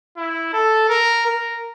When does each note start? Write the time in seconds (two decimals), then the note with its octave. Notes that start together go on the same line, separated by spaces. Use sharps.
0.17 E4
0.53 A4
0.89 A#4
1.26 A#4